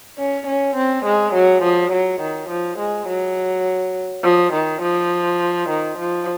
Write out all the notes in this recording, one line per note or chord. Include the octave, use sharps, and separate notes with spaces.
C#4
C#4
C4
G#3
F#3
F3
F#3
D#3
F3
G#3
F#3
F3
D#3
F3
D#3
F3